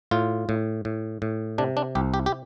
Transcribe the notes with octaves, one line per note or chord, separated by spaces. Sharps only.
A2 F4
A2
A2
A2
C3 D4
D4
C2 G4
G4
G4